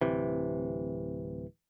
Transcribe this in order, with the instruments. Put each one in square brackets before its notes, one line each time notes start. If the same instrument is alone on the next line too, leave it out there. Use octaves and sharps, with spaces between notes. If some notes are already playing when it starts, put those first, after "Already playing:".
[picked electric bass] D1 C3 E3